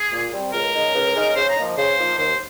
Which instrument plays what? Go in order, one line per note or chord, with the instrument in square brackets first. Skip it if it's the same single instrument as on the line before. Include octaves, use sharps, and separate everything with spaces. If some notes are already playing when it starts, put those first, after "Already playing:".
Already playing: [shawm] G#4
[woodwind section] A#2
G3 C4
[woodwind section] C#2 [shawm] A#4
[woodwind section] C#3 G#3 D#4
C#2
C#3 G#3 D#4
[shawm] A#4
[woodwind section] C#3 [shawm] C5
[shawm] A#5
[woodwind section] F3 A#3 D#4
[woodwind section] C#3 [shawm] C5
[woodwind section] F3 A#3 D#4
[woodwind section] D#2 [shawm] C5